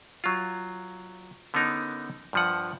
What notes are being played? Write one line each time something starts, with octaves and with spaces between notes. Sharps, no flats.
F#3 F4
D3 B3 C#4 D#4 A#4
G2 F3 F#5